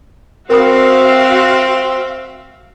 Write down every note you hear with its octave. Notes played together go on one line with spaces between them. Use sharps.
C4 F#4 A#4 E5 F5 B5 D#6